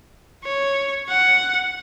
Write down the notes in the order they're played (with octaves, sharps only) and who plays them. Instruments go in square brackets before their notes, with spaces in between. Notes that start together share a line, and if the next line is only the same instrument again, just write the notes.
[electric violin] C#5
F#5